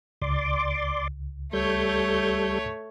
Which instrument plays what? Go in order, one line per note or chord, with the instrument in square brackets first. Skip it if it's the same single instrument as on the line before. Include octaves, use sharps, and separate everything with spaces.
[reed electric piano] C#2 [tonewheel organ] D5 C6 D6
[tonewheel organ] G3 A4 G6 [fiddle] A3 C#5